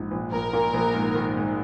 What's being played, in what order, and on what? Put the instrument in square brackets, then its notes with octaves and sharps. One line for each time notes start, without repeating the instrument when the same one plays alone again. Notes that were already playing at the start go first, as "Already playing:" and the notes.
Already playing: [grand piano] A#1 G#2
A#1
[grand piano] A#1 [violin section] A#4
[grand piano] A#2
A#1
G#2
D#3
G#2